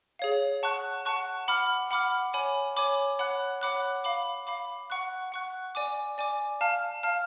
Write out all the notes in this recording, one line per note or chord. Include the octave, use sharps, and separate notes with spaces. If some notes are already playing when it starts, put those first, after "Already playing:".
G#4 C#5 F5
F#5 A5 C#6 F#6
F#5 A5 C#6 F#6
F#5 B5 D6 F6
F#5 B5 D6 F6
C#5 G#5 B5 D6
C#5 G#5 B5 D6
C#5 F#5 B5 D6 F#6
C#5 F#5 B5 D6 F#6
F5 B5 D6
F5 B5 D6
F#5 C#6 F#6
F#5 C#6 F#6
D5 G#5 D6
D5 G#5 D6
F5 A5 F6
F5 A5 F6